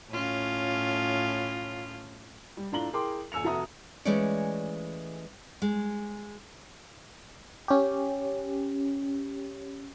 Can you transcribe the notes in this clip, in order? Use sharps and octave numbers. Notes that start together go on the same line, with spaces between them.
A2 C#4 F4
G3
A2 D4 F4 A#5 F#7 G7
E4 G#4 A#4 G5 C6 D6
D#1 G#5 E6 C#7 F7
F1 F#4 A4 E5 A#5 D#6
E3 G#3 A3 C#4 C#5 D5
G#3
C#4 G4